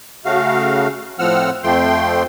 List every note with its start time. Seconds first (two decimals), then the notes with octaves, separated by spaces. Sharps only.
0.25 C#3 A3 F#4 F5
1.19 A2 F3 C4 F#5 E6 F6
1.64 F2 F3 A3 G5 C6